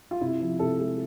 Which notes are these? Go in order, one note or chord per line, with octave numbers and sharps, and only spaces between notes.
F4
C3 E4
F3
C3 A4
G#3